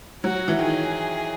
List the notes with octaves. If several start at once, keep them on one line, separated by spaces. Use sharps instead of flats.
F#3 F#4
E3
D#3 G#4